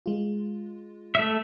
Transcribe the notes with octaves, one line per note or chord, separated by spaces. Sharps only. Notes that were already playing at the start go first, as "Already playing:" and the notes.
G#3 F4
A3 E5